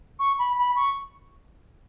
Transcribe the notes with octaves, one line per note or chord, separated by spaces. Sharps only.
C#6
B5
B5
C#6